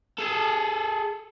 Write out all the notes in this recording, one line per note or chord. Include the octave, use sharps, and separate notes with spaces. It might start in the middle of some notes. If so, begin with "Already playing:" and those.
G#4 A4